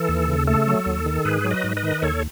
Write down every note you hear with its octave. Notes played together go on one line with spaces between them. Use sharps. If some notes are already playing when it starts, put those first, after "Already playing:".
Already playing: E3 A4
D#2
C#3
A3 A4
F#3
D#2
D#3
G#2 G#4 B4
F#3
B4 D#5
G#2
B4 D#5
D#3
D#2 A4 C#5